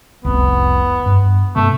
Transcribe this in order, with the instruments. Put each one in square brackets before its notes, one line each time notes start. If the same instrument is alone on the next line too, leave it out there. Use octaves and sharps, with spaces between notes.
[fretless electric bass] F1 C2 [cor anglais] B3
[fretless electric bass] G2
[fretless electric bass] G2 C3 B3 [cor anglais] A3